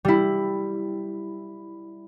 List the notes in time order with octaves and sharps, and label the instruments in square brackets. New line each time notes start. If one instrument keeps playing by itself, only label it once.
[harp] G3 E4